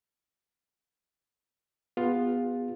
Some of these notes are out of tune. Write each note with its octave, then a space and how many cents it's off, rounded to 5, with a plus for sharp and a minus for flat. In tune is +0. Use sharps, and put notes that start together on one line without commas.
B3 +0 F4 +10 G#4 -35